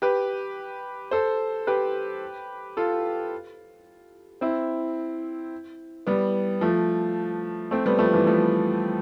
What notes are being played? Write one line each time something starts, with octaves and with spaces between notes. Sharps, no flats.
G4 B4
A4 C5
G4 B4
F4 A4
C4 E4
G3 B3
F3 A3
A3 C4
G3 B3
F3 A3
E3 G3
F3 A3